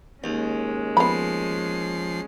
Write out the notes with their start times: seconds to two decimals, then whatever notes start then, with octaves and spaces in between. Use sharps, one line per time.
0.24 D#2 G#3 C#4
0.97 F3 B3 B5 C7